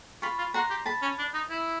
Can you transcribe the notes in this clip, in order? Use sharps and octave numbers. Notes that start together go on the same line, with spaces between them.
F4 B5 C#6
F4
F#4 A#5 C6
G4
A5 B5
C#4
D4
D#4
E4